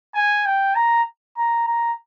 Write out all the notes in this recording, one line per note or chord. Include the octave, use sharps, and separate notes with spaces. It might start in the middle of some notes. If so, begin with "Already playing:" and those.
G#5
G5
A#5
A#5
A#5